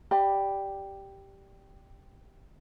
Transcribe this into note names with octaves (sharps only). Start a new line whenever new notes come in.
G4 D5 B5